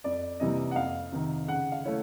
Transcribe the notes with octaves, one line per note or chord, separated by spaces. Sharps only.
F2 D5
C3 E3 G3 A#3 D#5
F#5
F2 F5
C3 D#3
C#3 F#5
F5
A3 C#4 E4